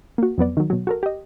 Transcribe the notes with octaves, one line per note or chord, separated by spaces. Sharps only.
A#3 F#4
F2 F#3 B3 D5
D#3 F#3
B2 F#3
F#4 A4 A#4
G4 D#5